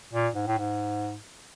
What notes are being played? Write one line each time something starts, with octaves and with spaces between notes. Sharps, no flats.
A#2
G#2
A2
G#2